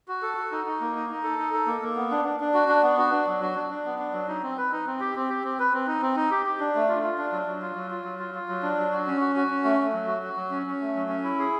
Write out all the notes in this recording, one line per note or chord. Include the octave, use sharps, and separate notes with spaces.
F#4
A4
F#4
D#4
D#4
A#3
D#4
D#4
A4
D#4
A4
A#3
A#3
B3
D4
D4
D4
F#4
D4
B3
F#4
D4
F#3
F#4
D4
D4
B3
D4
F#3
D#4
C4
B4
D#4
C4
G4
C4
G4
C4
B4
C4
D#4
C4
D#4
G4
G4
D4
A3
F4
F4
D4
F#3
F#3
F4
F#3
F4
F#3
F4
F4
F#3
D4
F#3
F#4
C#4
F#4
F#4
C#4
A3
A3
F#3
F#4
F#4
F#3
C#4
C#4
A3
F#3
C#4
E4
G#4